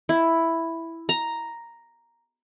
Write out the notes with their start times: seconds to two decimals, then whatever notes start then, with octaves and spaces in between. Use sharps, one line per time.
0.09 E4
1.09 A#5